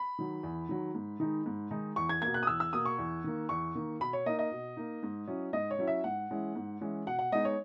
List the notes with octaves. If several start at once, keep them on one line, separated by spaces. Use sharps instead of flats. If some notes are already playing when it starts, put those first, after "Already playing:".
Already playing: B5
D#3 F#3
E2
D#3 F#3
G#2
D#3 G#3 D#4
G#2
D#3 G#3 D#4
E2 C#6
G#6
B2 A#3 G#6
F#6
D#6
E2 E6
E6
B2 A#3 D#6
C#6
E2
D#3 A#3
E2 C#6
D#3 A#3
B2 B5
C#5
A#3 D#4 D#5
D#5
B2
A#3 D#4
G#2
F#3 C#4 E4
G#2 D#5
C#5
F#3 C#4 E4
E5
G#2 F#5
E3 G#3 C#4 E4
G#2
E3 G#3 C#4 E4
B2 F#5
F#5
G#3 B3 D#4 D#5
C#5